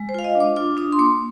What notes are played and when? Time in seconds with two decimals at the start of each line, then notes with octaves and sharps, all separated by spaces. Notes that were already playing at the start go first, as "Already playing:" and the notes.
Already playing: G#3
0.09 C5
0.14 F4 F5
0.24 D#5
0.35 D4
0.40 D6
0.56 F4 D6
0.77 D4 D#6
0.92 C6
0.99 A#3 D6